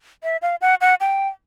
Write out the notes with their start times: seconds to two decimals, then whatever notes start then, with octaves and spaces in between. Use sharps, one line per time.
0.23 E5
0.42 F5
0.61 F#5
0.81 F#5
1.01 G5